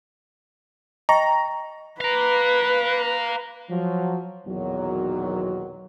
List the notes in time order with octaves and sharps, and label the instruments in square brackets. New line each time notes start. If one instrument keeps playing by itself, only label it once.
[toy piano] D#5 G5 C#6 [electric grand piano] A#5
[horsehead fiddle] B4 [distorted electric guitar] F5 A#5
[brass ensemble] F3 F#3
B1 E2 A#2 D#3 F#3